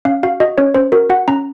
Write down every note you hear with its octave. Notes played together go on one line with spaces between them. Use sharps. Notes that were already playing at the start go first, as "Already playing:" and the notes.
C#4 F5
F#4 F5
F#4 D#5
C#4 C#5
C#4 C5
F#4 A#4
F#4 F#5
C#4 A#5